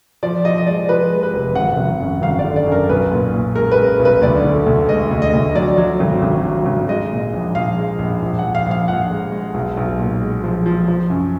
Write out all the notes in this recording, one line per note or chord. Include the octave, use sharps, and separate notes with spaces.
F3 D5
F3 D#5
D#5
G#3 D5
F3 B4
G#3
B4
F1
G#1 F#5
G#1
F#2
G#1 F5
D5
D3
D5
F#2
A#4
B1 B4
A#2
A#2
G#3 A#4
B4
G#3
B1
B4
D2 D5
D3
D2
G#3 D#5
D2
D#5
D2
F#3 D5
F#3
G#1
G#1
F#3
G#1
G#3 D#5
A#2
A#1
A#1 F5
G#3
A#1
A#1
A#1 F#5
F5
A#1
F5
A#1 F#5
G#3
G#3
B1
B1
A#2
G#3
F3
F3
F3
F#2